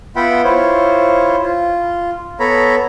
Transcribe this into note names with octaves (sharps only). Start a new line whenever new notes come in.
B3 F4 E5 F#5 G5 B5
E4 F4 C5 C#5
F4
B3 A4 C#5 A#5 B5